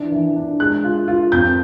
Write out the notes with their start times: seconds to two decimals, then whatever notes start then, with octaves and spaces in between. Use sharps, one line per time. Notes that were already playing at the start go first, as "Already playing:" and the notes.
Already playing: E3 D4
0.12 E3
0.36 D4
0.60 G#3 F#6
0.84 F4
1.08 F4
1.32 F2 G6